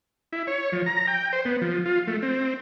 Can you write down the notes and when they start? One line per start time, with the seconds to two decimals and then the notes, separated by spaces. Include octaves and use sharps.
0.33 E4
0.47 C#5
0.72 F3
0.86 A#5
1.07 G5
1.33 C5
1.45 B3
1.61 F3
1.86 F4
2.07 A3
2.22 C4